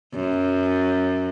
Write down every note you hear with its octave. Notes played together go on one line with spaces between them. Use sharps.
F#2